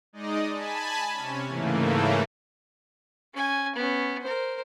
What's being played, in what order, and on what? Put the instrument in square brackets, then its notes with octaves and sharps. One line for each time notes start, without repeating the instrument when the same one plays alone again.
[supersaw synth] G#3 D#4 D5 D#5
G#5 A5 B5
C3 C#4
G#2 C#3 E3 A3 A#3
[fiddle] C#4 G#5
B3 C#4
A#4 C5